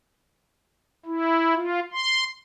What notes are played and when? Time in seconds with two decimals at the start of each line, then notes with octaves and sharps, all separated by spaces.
1.06 E4
1.55 F4
1.92 C6